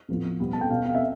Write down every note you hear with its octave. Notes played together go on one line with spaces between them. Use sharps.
A2 F3 B3
B2 G3 B3
A5
G5
B2 B3 F5
F5
E5